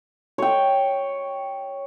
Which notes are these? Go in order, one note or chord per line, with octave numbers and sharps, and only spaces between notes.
C#5 G5